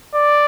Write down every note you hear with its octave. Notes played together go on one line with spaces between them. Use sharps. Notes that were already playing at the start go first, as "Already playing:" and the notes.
D5